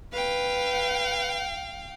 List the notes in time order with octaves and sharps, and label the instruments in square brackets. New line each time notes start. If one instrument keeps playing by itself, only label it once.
[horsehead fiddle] B4 [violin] F5 G5